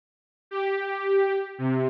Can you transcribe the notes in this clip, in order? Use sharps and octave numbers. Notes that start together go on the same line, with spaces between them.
G4
C3